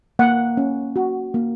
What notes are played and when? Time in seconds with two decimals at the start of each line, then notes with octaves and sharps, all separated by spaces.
0.19 A#3 F#5
0.57 C#4
0.96 F#4
1.34 A#3